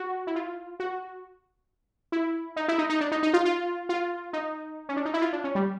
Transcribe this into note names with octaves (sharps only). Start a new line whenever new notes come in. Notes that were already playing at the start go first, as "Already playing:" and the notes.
Already playing: F#4
E4
F4
F#4
E4
D#4
E4
D#4
D#4
D4
D#4
D#4
F4
F4
F4
D#4
C#4
D4
D#4
E4
F4
D4
C#4
G3